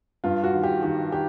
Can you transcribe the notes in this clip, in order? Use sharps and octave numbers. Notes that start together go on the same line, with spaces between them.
G2 F4
F#4
D#3
G4
D#3 G4
D#3 G4